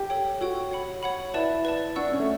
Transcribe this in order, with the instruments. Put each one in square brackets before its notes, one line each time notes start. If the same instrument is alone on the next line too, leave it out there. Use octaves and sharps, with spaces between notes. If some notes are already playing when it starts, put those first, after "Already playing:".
Already playing: [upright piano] G4
[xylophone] A4 C#5 G5
[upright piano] F#4 [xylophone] A4 C#5 G5
[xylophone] C#5 F#5 B5
C#5 F#5 B5
[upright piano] E4 [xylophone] B4 D5 A5
[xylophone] B4 D5 A5
[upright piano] D4 [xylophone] D5 F#5 C#6 E6
[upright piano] C#4
A3